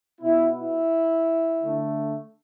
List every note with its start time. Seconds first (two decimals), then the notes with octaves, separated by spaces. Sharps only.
0.21 B2 B3 E4
0.56 E4
1.64 D3 A3